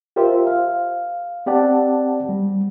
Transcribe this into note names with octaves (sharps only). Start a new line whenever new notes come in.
F4 G4 A#4 C5 E5
F5
C4 G4 D5 F#5 A5
G3